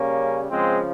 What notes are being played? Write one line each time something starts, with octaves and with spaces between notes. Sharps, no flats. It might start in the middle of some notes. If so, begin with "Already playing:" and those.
Already playing: C#3 G3 A#3 C#4
C#3 F3 G#3 C4